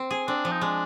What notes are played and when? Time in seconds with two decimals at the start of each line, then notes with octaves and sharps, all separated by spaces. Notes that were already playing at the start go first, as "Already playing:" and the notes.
Already playing: C4
0.11 G#4
0.28 C4 D4
0.45 F3
0.52 D#4
0.62 G#3 D4